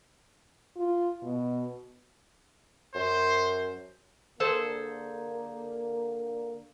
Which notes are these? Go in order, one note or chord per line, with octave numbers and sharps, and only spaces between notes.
F4
B2
F#2 C5
D3 A#3 G#4 A4 C5